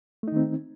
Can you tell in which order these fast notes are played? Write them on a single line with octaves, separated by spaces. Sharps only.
A3 D#4 D#3 C4